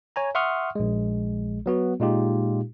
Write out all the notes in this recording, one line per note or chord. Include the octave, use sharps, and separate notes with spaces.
C#5 G#5 A#5
E5 F#5 C6 C#6 D#6 F6
A#1 G#3
F#3 B3 F#4
A#2 G#3 D#4 F4 G4